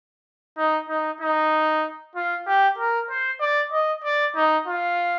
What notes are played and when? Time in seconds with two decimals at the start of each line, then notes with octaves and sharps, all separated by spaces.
0.57 D#4
0.89 D#4
1.21 D#4
2.15 F4
2.47 G4
2.78 A#4
3.10 C5
3.40 D5
3.72 D#5
4.04 D5
4.36 D#4
4.67 F4